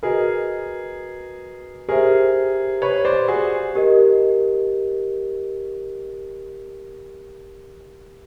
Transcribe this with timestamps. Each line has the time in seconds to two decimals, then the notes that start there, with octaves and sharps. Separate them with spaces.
0.03 F#4 G#4 A#4 B4 D#5
1.89 G4 G#4 A#4 C5 E5
2.82 B4 C#5
3.05 C5 D5
3.28 F#4 G#4
3.75 G4 A#4 D#5